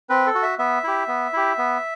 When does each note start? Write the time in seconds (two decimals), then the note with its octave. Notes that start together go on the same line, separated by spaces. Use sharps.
0.09 C4 B4
0.27 A4
0.35 F#4
0.43 E5
0.59 B3 E5
0.84 E4 G4
1.08 B3
1.33 E4 G4
1.58 B3